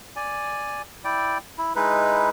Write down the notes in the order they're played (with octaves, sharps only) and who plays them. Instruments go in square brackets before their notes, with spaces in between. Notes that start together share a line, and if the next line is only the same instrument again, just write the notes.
[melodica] D5 G#5
E4 D5 G5
E4
G#3 D#4 E4 B4